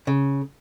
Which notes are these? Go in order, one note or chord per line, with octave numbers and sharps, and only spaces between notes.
C#3